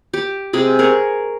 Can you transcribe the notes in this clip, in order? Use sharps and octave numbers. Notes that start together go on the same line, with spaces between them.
G4
C3 G#3 G#4
G#4 A#4 C#6